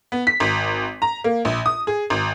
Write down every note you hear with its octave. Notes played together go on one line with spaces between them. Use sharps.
B3
B6
G#1
A#5
A#3
A#1
D#6
G#4
G#1